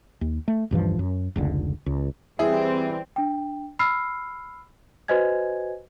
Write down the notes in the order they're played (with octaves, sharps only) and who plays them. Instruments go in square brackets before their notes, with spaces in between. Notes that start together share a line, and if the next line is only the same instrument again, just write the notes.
[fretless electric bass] D#2
A3
D#1 G2 E3 F3
F#2
F1 C#2 D3
C#2
[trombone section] E3 G3 [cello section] C4 [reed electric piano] E4 E5 [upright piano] G#4
[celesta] D4 G5
B5 E6 F6 C7
F#4 B4 C5 D#5 G#5 G#6